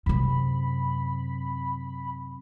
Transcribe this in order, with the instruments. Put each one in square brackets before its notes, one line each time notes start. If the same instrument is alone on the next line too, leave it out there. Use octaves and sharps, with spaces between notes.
[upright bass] F#2 C3 [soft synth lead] B5